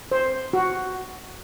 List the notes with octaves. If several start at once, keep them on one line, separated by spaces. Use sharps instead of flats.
C5
F#4